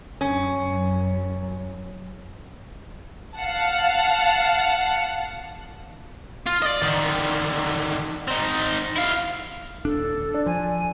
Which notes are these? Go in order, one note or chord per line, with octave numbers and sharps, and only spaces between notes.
F#2 C#4
F5 F#5 A5
F4
D5 D#5
D3 D#3
C4 D#4
E4 F5
D#1 D4 A4
D4
F3 G#5